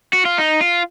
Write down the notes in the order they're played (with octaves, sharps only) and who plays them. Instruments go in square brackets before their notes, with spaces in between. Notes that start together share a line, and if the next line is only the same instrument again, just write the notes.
[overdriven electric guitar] F#4
F4
D#4
F4